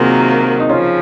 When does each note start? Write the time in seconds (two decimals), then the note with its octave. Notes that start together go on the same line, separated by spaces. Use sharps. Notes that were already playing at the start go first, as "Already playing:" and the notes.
Already playing: C3 D#3 F#3 A#3 F4 F#4 G#4 A#4
0.60 D#4
0.69 C#3 F3 C#4 F4